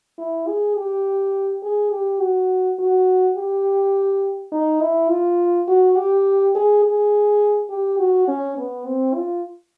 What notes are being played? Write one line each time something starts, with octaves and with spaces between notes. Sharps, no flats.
E4
G#4
G4
G#4
G4
F#4
F#4
G4
D#4
E4
F4
F#4
G4
G#4
G#4
G4
F#4
C#4
B3
C4
F4